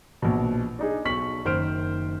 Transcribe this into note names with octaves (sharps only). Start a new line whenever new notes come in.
A#1 B2
D4 D#4 G#4
B1 C#6 B6 F#7
F#1 D#3 C5 F6 D7